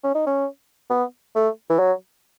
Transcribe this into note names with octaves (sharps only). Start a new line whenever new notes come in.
C#4
D#4
C#4
B3
A3
E3
F#3